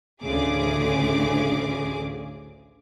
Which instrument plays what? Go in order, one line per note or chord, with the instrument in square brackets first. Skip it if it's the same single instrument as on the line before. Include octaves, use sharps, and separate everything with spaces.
[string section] A1 D2 C#3 G#4 D6